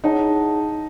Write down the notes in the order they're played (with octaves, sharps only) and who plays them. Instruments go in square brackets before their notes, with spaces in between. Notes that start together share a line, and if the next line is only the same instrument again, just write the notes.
[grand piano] D#4 [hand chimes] E4 G#4 C#5 F#5 A5